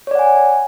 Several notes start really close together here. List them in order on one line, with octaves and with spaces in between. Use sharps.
C#5 D5 F#5 G#5